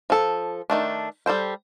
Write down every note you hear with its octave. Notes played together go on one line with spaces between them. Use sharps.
F3 A4
D#3 A3 D4
G3 A4 C5 G5